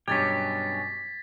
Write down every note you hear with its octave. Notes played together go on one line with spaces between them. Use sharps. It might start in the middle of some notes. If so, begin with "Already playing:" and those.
G2 B2 F#3 C#4 G4 G#6 A6 B6